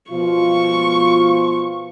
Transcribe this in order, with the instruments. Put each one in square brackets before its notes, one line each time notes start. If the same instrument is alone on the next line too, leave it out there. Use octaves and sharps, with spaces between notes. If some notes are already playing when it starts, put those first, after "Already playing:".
[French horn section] B2 F3 F4 [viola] C#6